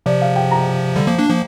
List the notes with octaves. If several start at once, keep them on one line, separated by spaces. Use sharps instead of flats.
C3 F3 D5
F5
G5
A#5
D3 G3
F3 A#3
A#3 D4
F3 A#3